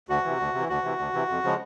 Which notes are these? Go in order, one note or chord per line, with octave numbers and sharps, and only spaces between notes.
D2 F#4
C3 E3
D2
C3 E3
D2 F#4
C3 E3
D2
C3 E3
F2
C#3 F3 G#3